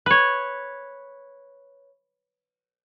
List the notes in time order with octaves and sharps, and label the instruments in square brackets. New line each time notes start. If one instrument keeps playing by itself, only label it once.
[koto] B4 C#5